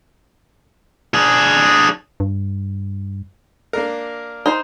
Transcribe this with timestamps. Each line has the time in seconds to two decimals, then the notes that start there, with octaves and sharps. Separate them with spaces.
1.14 D4 G#4
2.20 G2
3.73 A#3 D4 A#4
4.46 D#4 C5